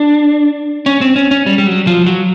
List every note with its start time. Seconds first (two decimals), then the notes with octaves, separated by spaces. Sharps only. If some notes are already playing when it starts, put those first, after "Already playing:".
Already playing: D4
0.86 C#4
1.01 C4
1.16 C#4
1.31 C#4
1.46 G3
1.58 G3
1.67 F#3
1.87 F3
2.06 F#3